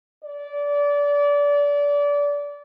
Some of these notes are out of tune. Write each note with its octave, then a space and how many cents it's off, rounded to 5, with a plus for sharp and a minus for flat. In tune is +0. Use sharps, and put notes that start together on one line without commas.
D5 -25